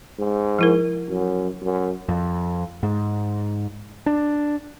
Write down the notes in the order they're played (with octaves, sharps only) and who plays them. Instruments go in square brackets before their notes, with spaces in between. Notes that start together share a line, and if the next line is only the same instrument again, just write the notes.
[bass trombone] G#2
[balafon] F3 E4 A#4
[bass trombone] F#2
F#2
[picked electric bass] F2
G#2
D4